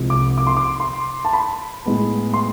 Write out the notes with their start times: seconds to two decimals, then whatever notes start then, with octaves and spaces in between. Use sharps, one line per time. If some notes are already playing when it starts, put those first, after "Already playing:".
Already playing: C2 C3 F3 G#3
0.10 D6
0.38 D6
0.47 C6
0.57 D6
0.80 C6
1.25 A5
1.33 B5
1.86 A2 G#3 B3
2.34 C6